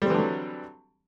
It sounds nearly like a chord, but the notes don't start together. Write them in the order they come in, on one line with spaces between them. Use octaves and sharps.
G3 C4 E3 D3 F#3